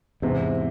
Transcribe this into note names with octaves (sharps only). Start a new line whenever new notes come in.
E2 G#2 C3